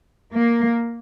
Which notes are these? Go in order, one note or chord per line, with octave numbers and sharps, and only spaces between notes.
A#3